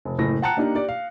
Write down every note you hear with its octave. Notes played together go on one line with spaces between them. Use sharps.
F1
F#1 A2 A#6
F#5 G5 A5 A#5 F#6 C#7
A#3 D4 D#4 G4
G4 D5
F5